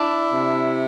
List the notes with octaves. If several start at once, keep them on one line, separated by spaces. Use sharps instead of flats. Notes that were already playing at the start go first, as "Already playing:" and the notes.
Already playing: D4 E4
C3